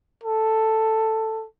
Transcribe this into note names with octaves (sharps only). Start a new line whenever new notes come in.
A4